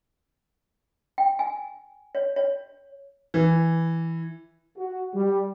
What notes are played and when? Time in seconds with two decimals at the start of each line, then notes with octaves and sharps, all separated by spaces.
1.18 G5
1.39 G#5
2.15 C#5
2.36 C#5
3.34 E3
4.77 F#4
5.14 G3